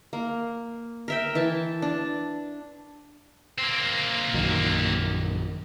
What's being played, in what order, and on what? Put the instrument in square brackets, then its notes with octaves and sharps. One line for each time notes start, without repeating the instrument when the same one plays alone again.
[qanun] A#3
A#4 E5 G5
E3 E5 A5
D4
[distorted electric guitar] A#3 C4
[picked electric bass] A#1 F#2 D#3